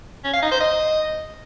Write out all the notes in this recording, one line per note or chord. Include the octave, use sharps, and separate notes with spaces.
C#4
F5
D#4
C5
D#5